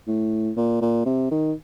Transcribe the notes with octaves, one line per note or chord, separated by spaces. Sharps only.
A2
A#2
A#2
C3
D#3